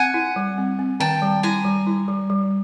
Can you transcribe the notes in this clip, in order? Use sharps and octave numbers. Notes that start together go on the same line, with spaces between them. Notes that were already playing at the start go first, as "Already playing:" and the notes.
Already playing: C4 F#5 G#5
E4
G3
C4
C4
D#3 G5 A5
G3
E4 G#5 A#5
G3
E4
G3
G3